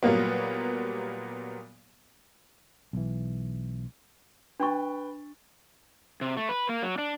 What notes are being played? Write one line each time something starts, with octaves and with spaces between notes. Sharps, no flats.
A#2 F#3 G3 A#3 B3
B1 E3
D4 B4 G5 C#6 A6
C3
A3
B4
A#3
F#3
D4